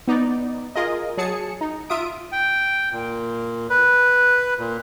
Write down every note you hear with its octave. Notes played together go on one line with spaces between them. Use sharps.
B3 D#4 D5
F4 G#4 A#4 D#5
F#3 G#4 A5 C#7
D#4
F4 E5 D#6 D7
G5
A#2
B4
A#2